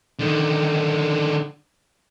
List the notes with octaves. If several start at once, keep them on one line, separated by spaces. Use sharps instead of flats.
D3 D#3